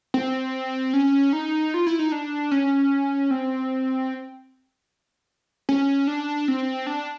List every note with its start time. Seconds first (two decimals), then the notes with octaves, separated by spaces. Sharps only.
0.14 C4
0.93 C#4
1.33 D#4
1.74 F4
1.87 E4
1.99 D#4
2.12 D4
2.51 C#4
3.31 C4
5.69 C#4
6.07 D4
6.48 C4
6.87 D4